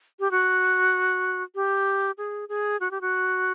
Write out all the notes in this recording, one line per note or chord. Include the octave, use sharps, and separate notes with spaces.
G4
F#4
G4
G#4
G#4
F#4
G4
F#4